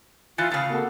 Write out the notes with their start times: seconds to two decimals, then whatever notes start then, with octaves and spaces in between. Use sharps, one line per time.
0.38 E3 F4 F#6 A6 C#7
0.52 A2 C#3 F5 A6
0.70 A#3 F#4 A4